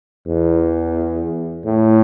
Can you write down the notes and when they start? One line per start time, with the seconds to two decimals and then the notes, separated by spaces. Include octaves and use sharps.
0.27 E2
1.66 A2